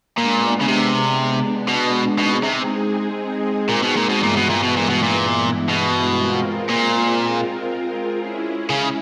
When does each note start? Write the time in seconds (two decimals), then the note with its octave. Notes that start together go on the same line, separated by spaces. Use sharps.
0.18 A#2 G#3 B3 D4
0.61 C#3
0.68 C3
1.68 B2
2.18 B2 G#3 C4 D#4 G#4
2.44 C3
3.69 A#2
3.83 B2
3.96 A#2
4.09 B2
4.19 G2 A#2 E3 G#3 B3 E4
4.36 B2
4.49 A#2
4.63 B2
4.77 A#2
4.90 B2
5.03 A#2
5.69 B2
6.19 G#3 C4 F4 A#4
6.70 A#2
8.20 G#3 C#4 E4 G#4
8.70 C#3